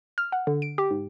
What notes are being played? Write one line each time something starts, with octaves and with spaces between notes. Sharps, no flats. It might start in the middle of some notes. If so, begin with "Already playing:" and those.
F6
F#5
D3
D7
G4
G#2